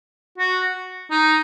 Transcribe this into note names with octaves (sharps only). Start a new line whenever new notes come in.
F#4
D#4